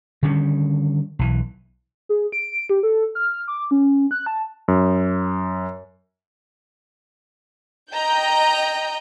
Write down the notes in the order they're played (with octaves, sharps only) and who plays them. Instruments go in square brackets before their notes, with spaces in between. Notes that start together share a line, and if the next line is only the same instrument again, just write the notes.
[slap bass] D3 D#3 G3 C#4
B1 E3
[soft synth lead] G#4
D7
G4
A4
F6
D6
C#4
F#6
A5
[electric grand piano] F#2
[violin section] D#5 G5 A#5 G6